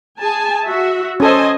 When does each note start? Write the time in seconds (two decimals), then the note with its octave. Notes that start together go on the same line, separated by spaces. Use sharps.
0.19 G#4 G#5 A5
0.65 F#4 E5
1.20 C#4 A4 C5 D#5 G#5